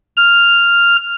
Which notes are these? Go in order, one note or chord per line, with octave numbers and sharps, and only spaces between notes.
F6